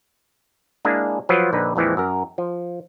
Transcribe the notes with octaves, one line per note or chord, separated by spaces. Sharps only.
G#3 A#3 D4 E4 G#4
F3 F#3 F4 B4
A#1 D3 D#4 B4
A#1 F2 E3 F3 G#3
F#2 A#4
F3